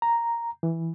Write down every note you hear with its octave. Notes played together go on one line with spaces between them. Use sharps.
A#5
E3